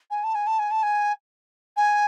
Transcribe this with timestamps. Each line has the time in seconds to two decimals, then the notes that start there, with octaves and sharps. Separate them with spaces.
0.11 G#5
0.24 A5
0.35 G#5
0.47 A5
0.59 G#5
0.71 A5
0.83 G#5
1.77 G#5